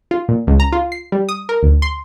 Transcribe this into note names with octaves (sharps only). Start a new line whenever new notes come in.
F4
A#2
C#2
A#5
F4
C7
G3
D#6
A#4
D2
C6